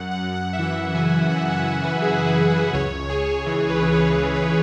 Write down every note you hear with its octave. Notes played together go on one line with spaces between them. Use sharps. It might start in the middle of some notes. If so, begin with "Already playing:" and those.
Already playing: F#2 F#5
F#5
F#2
F#5
E5
E3 F#5
C#3 G#5
F#2 F#5
F#5
F#2 E5
B4
E3 G#4
B4
C#3
B4
C#2 C#5
C#2 G#4
E3
B4
C#3
B4
C#2 B4
B4